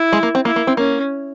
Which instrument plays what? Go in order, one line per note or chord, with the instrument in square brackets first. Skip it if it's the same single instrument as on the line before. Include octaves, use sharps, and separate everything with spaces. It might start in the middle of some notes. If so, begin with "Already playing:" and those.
Already playing: [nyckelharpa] E4
[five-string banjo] G#3
A#3
C4
[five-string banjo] A#3 [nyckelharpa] E4
[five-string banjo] A#3
C4
[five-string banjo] A#3 [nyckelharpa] C#4